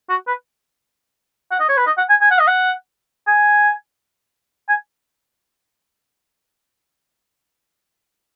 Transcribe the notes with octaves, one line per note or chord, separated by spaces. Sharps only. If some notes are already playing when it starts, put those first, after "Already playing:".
F#4
B4
F#5
D#5
C#5
B4
D#5
F#5
G#5
G#5
F#5
D#5
F#5
G#5
G#5